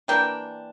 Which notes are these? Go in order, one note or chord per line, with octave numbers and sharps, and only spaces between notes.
E3 A#3 D4 G5